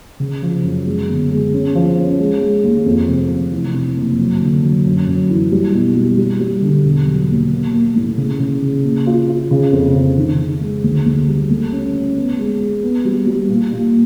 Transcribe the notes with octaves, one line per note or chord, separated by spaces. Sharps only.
C#3
F3
F#2
G#3
G1
G#3
C#4
F3
C#4
G#3
G#3
D#2
F2
F1
F1
E3
C3
F#1
F#3
D3
F#3
F#2
F#2
E3
G3
B2
G3
G3
G3
D3
E1
F#3
D#2
A#3
A#3
A2
C#3
C#3
C#3
A#2
F4
F4
C#3
F2
C#3
D#3
D#3
G#3
D2
D2
G3
A3
C#4
C#4
B3
G#3
G#3
B3
G3
G3
A#2
A#2